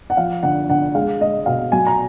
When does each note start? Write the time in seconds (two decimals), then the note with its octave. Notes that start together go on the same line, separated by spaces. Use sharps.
0.10 F#5
0.17 F3 F5
0.43 D3 F#5
0.69 D3 F#5
0.94 G#3 F5
1.20 G#3 D#5
1.46 B2 F5
1.72 F#3 G#5
1.87 A#5